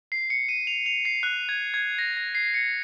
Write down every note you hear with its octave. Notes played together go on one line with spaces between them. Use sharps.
C7
C#7
D#7
F7
F7
C7
F#6
G#6
G#6
A#6
A#6
C7
C#7